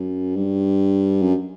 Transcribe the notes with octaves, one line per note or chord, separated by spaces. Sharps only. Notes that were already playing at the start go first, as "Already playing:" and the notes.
Already playing: F#2
G2
F#2